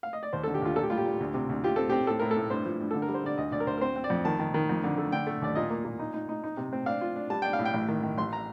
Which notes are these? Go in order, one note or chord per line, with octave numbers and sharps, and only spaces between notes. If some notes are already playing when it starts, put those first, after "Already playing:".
F5
D#5
D5
D#2 C5
A4
D3
G4
D#2 F4
A#2 A4
G4
G3 F4
G4
A#2
D2
C3
D2
F4 G4
C4 A4
C4 G4
A2 A4
A2 A#4
A4
A2
G2 C5
F3
G2
D3 A4
A#4
G3
C5
D3 D5
D2 D#5
D2 D5
A#4
D2 C5
A#4
C4 C5
C4
D5
F2
D#3 A5
D#3
D#3
F2
D3
A3
D3 G5
A3
D#2 D5
A#2 D#5
A#3
A#2
D#4
D#4
D#4
D#4
C3
C4
D4 F5
F4
D4
G3 A5
D4 G5
F5
A2
G5
A1
D#3
D#3
A1 C6
A#5